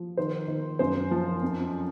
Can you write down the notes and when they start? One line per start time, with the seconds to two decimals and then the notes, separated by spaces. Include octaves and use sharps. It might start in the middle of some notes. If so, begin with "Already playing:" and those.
Already playing: F3
0.17 D#3 C5
0.48 D#3
0.79 F#2 C5
1.11 F3
1.42 F2